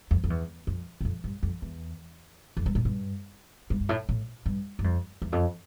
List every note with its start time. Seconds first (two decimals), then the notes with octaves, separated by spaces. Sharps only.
0.11 F2
0.24 F2
0.30 E2
0.67 F2
1.01 G2
1.05 F2
1.24 G2
1.43 F2
1.62 E2
2.57 F2
2.66 G2
2.75 A2
2.85 G2
3.70 G2
3.81 G2
3.89 A2
4.09 A2
4.46 G2
4.79 G2
4.84 F2
5.22 E2
5.32 F2